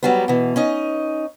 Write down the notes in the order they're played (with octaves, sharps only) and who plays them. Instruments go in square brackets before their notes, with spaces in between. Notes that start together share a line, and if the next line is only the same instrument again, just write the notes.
[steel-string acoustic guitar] F#3 G3 B3
B2 E3
C#4 D#4 D#5